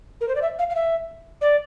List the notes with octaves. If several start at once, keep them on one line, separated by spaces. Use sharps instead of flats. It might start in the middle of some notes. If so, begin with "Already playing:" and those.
A#4
C5
D5
E5
F5
F5
E5
D5